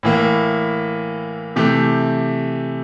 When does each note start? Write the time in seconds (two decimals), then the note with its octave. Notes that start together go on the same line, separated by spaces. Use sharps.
0.03 A2 E3 A#3
1.56 C3 E3 A3 G4